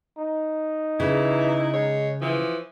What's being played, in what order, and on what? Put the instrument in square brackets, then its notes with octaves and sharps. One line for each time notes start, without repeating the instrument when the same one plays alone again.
[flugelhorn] D#4
[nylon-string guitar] C#3 [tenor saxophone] E3 [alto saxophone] E4
[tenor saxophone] G#3 [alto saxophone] C#5
[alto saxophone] E3 [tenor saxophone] F3